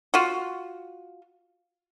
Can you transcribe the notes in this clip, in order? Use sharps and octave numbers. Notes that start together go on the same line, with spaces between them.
F4 F#4